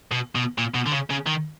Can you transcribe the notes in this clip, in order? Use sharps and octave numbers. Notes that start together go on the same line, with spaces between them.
B2
B2
A#2
B2
D3
C#3
C#3
D#3